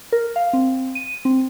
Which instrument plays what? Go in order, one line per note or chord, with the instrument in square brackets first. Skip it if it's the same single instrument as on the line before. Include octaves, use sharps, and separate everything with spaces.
[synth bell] A#4
F5
C4
D#7
C4